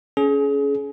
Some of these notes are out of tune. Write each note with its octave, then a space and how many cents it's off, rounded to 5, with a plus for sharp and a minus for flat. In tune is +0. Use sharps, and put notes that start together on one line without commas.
C#4 +20 G#4 +30